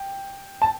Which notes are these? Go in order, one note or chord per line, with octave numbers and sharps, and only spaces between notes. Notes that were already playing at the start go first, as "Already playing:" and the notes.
Already playing: G5
A5